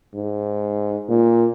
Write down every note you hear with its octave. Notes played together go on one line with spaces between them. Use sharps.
G#2
A#2